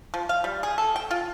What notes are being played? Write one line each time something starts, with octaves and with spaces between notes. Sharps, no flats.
F3
F5
G3
G#4
A4
G5
F4